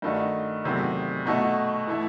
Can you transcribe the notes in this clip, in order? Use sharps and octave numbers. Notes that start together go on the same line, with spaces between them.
G2 D#3 A3 D#4 F#4
E2 C3 D#3 F#3 A3
B2 A3 D#4 F#4
E3 A3 E4